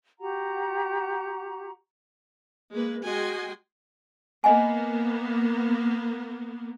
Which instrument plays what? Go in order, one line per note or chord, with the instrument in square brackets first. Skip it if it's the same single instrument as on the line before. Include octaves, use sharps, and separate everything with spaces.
[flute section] F#4 G4 F#5 A#5
[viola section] G#3 A#3 B4
G#3 F#4 D#5 G5 G#5 C6
[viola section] A#3 B3 [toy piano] D#5 F#5 G#5